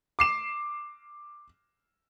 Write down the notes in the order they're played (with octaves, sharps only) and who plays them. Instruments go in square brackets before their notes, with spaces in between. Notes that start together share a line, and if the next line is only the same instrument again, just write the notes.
[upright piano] D6 C7 E7